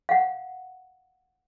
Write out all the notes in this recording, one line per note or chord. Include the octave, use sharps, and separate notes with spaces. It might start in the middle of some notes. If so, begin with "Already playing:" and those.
F5 F#5